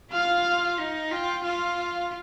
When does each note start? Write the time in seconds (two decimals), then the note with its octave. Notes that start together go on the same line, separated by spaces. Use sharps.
0.11 F4 F5
0.78 D#4
1.11 F4 G5
1.44 F4 F5